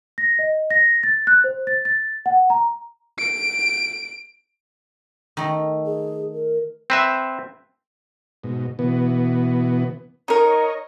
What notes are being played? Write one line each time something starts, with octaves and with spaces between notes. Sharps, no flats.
A#6
D#5
A#6
A6
F#6
C5
A6
A6
F#5
A#5
D7
D#3 A3
G#4
A#4
C4 B4 E5
G#2 B2
B2 E3 B3
D#4 A#4 C#5 D#5